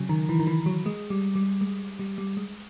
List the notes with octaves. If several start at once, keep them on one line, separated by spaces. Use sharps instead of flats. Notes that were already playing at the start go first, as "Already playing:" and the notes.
Already playing: C#3 F#3
D#3
E3
D#3
E3
F#3
G#3
G3
G3
G#3
G3
G3
G#3